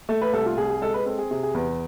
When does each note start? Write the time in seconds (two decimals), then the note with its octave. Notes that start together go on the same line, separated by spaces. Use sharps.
0.09 A3 A4
0.22 B4
0.33 C2 A4
0.46 F4
0.58 C2 G#4
0.70 G#4
0.82 G#3 A4
0.94 B4
1.06 C4 A4
1.18 G#4
1.31 C3 G#4
1.43 G#4
1.54 E2 B4